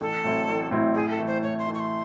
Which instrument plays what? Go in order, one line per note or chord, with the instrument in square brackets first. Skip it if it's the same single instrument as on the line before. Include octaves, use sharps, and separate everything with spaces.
[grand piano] A1 [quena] A4
[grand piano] A2 F#3 C4 E4
A1
A2 F#3 C4 E4
[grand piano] A2 [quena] G#4
[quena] A4
[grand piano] E3 A3
[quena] C5
[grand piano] A2 [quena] C#5
[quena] C6
[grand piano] E3 A3
[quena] C#6
C6